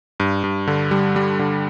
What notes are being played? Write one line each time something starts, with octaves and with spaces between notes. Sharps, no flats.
G2
G2
D3
G3
G3
D3